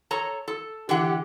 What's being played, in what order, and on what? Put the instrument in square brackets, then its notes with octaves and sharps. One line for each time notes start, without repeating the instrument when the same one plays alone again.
[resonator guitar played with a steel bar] A4 C#5 A#5
A4
[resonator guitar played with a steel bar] D3 E3 F#5 [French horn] G4